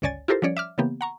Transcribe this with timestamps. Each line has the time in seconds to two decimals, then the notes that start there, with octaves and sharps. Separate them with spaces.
0.02 G1 C#2 C#5 D5 G#5 A6
0.28 E4 F4 G4 A4 A#4 C5
0.42 F3 G3 C#4 C#5 D5
0.57 E5 D6 F6
0.78 C#3 E3 A#3 B3 G4
1.01 F#5 A#5 C#6